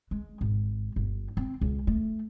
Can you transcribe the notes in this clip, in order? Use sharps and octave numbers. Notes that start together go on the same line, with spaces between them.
G#3
G#1
G1
C4
C#2
A3